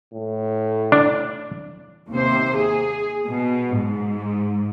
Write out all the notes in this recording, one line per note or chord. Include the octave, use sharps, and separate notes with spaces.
A2
D4
D#2 C3 C5
G#4
B2
G#2